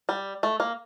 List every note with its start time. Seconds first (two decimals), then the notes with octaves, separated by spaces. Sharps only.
0.09 G3
0.43 A3
0.60 A#3